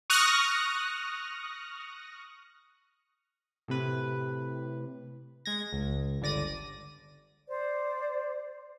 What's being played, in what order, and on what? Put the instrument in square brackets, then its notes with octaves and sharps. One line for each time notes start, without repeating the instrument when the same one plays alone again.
[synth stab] C#6 D#6 F6 F#6 A#6
[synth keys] A2 C3 B4
G#3 G#6 A#6
C#2
G1 D3 D5 A#6 D#7
[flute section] C5 D5